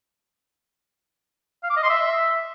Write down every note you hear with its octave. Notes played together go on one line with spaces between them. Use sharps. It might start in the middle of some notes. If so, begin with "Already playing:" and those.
F5
D6
D#5
C6
E5